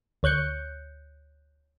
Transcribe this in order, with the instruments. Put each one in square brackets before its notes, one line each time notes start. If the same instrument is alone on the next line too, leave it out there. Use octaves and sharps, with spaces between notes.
[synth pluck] D2 C#5 F#6 G6 C#7